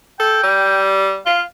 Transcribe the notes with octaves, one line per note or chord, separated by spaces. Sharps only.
A4 G5
G3
F4 F5